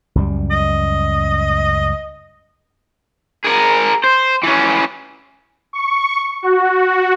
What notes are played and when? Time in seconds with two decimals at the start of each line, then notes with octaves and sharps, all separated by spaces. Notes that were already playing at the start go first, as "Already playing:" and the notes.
0.15 C#2 F#2 G3
0.51 D#5
3.45 G#4 A#4
4.04 C5
4.43 E3 C#4
5.73 C#6
6.43 F#4